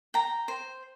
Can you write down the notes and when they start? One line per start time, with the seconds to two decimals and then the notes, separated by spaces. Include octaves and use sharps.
0.14 G5 A#5
0.48 C5